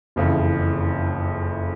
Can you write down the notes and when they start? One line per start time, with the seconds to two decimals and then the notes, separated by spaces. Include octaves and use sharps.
0.16 F#1 F2 C#3 E3